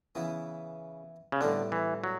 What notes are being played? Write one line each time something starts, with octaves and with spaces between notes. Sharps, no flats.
C#3 E3 B3 E4
C#3
A2 D3 G3 B3 D4
E3
F#3